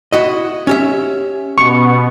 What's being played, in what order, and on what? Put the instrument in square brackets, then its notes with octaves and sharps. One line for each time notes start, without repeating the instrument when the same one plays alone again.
[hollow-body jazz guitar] E4 F#4 D#5
C#4 G4 E5
[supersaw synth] B2 B3 [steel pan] C#6